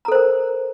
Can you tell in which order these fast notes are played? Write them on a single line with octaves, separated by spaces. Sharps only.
A#5 A4 C5 A#4